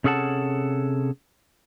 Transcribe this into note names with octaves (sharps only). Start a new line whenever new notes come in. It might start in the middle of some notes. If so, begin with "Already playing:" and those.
C3 C#4 G#4 A4 F#5 A5